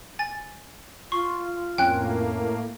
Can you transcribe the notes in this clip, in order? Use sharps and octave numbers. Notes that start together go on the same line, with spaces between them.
G#5 A6
F4 C6 C#6
F2 A2 A#3 C#4 G5 G#5 F#6